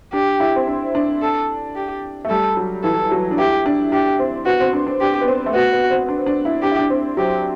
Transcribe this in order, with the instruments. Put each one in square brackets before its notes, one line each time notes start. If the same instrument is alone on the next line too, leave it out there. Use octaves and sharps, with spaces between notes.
[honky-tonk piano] D4 [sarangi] G4
[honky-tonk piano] E4
C4
D4
D4
[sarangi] A4
G4
[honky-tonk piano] A3
[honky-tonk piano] G3 [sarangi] A4
[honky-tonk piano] F#3
[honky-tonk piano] E3 [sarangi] A4
[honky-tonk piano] F#3
D4
[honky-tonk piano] E4 [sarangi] G4
[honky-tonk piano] D4
[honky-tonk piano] D4 [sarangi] G4
[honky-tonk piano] C4
[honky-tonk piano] B3 [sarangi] F#4
[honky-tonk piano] C4
D4
D4
[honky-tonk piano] D4 [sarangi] G4
[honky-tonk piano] B3
C4
A3
[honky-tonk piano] B3 [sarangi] F#4
[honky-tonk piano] B3
C4
D4
D4
E4
[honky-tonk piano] D4 [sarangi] G4
[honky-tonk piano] E4
D4
C4
[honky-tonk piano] F#3 [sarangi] G4